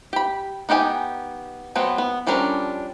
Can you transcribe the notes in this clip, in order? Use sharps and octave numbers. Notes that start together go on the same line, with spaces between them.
G4 B5
B3 D#4 G4 F#5 G#5
F#3 A3 B3 C4 B4
B3
F3 G3 C#4 D4 A#4